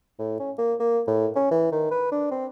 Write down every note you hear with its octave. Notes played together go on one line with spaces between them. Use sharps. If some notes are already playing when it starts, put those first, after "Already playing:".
A2
C#4
A#3
A#3
A2
C#4
E3
D#3
B4
D4
C4